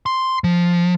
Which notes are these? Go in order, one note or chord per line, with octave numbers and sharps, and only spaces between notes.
C6
F3